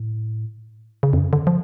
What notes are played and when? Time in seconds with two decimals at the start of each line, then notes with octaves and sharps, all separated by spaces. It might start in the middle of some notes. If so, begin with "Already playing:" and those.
Already playing: A2
1.03 C#3
1.13 F2
1.18 F#2
1.33 D3
1.47 F3